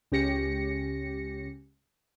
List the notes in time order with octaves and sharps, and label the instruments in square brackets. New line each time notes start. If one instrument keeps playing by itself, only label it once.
[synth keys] C#2 C#4 G4 A#6 C#7